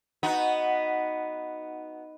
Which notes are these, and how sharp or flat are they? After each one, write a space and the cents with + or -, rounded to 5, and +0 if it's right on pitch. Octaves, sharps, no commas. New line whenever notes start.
B3 +0 D#4 +0 F#4 -5